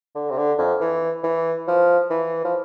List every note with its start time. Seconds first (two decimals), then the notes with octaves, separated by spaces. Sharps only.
0.15 D3
0.30 C3
0.37 D3
0.58 F2
0.80 E3
1.24 E3
1.67 F3
2.10 E3
2.45 F3